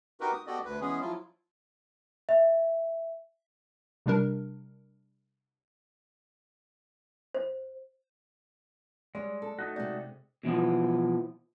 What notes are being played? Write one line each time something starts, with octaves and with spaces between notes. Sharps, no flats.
D#4 F#4 G4 A#4 B4
D#6
B3 F#4 G4 A4 D5 D#5
D2 B4
E3 G#3 B3 C#4 G#4
F3 F#3 E4 F4
E5
C3 G3 D4 A#4
C5
G3 G#3 C#5 D5
A4
A3 D#4 F#4
C3 G#3 G#4 D5
B2 E3 F3 B3